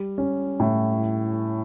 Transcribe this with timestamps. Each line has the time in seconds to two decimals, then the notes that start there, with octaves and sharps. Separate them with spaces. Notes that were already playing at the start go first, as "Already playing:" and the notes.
Already playing: G3
0.18 C#4
0.60 A2